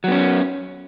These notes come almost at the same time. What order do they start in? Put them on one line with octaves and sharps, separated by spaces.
F#3 B3 C#4